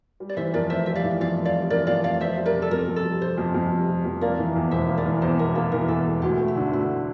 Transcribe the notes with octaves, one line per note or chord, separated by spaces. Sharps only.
G3
D5
E3 C5 E5
F2 A#4 D5
F1 C5 E5
G3 E5
D5 F5
E3
F2 D5 F5
F1
D5 F5
G3
E3 A#4 D5
F2 D5 F5
F1 D5 F5
F2 C5 E5
G3
A#4 D5
C3
A4
F2 A#4
F2
A4
G3
C3 C5
F2
F2
G3
C3
F2
A#3 A#4 D5
E3
E2
E1 C5 E5
A#3
A#4 D5
E3
E2 C5
E1 A#4
A#3 A4
E3 A#4
E2 A4
E1
D2 G4
A3
E4
D3
D2 E4